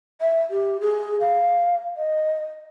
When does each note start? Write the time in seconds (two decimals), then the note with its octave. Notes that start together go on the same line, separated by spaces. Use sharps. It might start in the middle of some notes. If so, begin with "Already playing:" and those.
0.21 E5
0.50 G4
0.81 G#4
1.20 F5
1.97 D#5